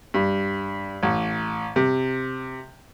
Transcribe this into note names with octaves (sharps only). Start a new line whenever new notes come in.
G2
A1
C3